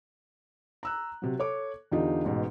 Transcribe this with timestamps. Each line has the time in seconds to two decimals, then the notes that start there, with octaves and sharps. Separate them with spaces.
0.83 A#5 E6 F#6
1.22 C3 F#3
1.39 A4 C#5 D6
1.92 E2 D3 D#4 F4 G4 D#5
2.24 A1 G#2 B2